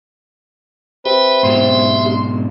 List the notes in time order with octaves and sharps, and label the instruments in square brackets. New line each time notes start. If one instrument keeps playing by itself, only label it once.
[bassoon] C4 [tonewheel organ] G4 E5 [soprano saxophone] B4
[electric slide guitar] G#2 B2 F#3 [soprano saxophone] C6